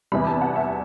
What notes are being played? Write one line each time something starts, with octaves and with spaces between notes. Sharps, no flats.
E2 C3 G3 B5
A5
F#5
E5